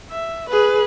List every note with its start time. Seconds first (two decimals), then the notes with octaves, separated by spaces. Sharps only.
0.11 E5
0.50 G#4 B4